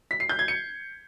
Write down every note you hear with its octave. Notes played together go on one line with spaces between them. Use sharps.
B6
C7
G6
G#6
C#7